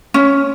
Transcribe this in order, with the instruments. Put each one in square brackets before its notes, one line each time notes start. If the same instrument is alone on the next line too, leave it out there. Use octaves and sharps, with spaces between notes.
[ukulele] C#4